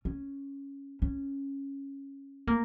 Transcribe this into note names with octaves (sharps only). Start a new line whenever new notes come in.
C#4
C#4
A#3